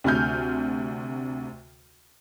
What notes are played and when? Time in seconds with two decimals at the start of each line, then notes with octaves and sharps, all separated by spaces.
0.04 D2 C3 G#5 F6 G6